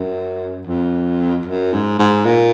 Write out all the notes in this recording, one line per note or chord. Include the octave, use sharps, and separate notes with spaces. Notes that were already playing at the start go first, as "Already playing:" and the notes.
Already playing: F#2
F2
F#2
G#2
G#2
A#2